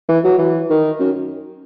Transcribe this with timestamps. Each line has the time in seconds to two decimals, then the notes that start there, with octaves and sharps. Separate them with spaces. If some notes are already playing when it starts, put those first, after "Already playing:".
0.08 E3
0.24 F#3
0.38 E3
0.70 D#3
1.00 F#2